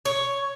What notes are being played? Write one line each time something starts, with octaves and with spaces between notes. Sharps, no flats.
C#5